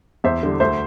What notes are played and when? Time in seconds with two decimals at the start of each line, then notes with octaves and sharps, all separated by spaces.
0.24 E2 C5 E5
0.43 D3 G3
0.60 D2 C5 E5